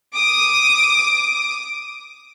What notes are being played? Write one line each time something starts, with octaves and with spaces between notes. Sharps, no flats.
D6 D#6